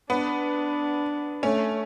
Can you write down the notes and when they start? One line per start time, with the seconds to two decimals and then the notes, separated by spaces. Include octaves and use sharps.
0.10 B3 D4
1.43 A3 C#4